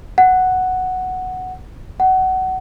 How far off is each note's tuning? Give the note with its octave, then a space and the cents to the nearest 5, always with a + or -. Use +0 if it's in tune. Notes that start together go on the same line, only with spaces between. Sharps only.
F#5 +0
F#5 +25